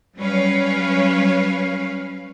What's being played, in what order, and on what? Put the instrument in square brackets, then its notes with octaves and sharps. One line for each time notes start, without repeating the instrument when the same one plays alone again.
[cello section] F#3 G3 C#4 B4 C#5 F5